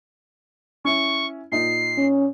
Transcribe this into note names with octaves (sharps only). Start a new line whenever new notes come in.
C#4 E4 C#6
A#2 D#4 C7
C#4